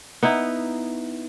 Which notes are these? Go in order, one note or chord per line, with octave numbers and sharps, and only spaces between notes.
B3 D#4 E4